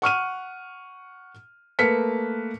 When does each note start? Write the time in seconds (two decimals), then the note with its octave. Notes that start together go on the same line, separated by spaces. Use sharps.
0.02 F#5 C#6 F6 D#7
1.79 A3 A#3 B4 F6 B6 C#7